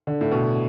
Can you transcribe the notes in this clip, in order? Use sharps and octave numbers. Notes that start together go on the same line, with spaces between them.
D3
A2
B2